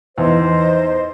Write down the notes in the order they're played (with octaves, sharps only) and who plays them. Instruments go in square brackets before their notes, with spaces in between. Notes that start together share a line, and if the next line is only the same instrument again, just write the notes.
[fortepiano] E2 [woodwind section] D#4 C5 [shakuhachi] D#5